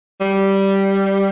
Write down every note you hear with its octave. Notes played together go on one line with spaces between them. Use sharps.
G3